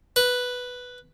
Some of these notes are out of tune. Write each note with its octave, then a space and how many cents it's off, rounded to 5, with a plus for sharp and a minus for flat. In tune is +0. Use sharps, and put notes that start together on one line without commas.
B4 +0